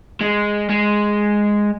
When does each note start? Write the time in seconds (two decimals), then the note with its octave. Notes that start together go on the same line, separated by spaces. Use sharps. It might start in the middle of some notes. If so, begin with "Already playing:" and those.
0.21 G#3
0.70 G#3